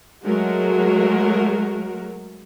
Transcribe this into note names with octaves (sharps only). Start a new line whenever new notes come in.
F#3 G#3 A3 F#4 A#4